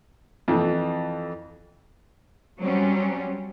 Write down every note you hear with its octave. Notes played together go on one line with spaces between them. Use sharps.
F2 E3
F#3 G3 C4 C#4